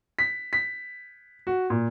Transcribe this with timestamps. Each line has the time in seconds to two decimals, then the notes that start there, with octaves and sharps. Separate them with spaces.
0.19 B6
0.53 B6
1.47 F#4
1.70 A#2